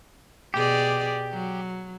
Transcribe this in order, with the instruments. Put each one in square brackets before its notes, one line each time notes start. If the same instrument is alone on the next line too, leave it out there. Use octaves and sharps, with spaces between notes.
[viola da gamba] B2 G#4 D5 [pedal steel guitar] G4
[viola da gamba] F#3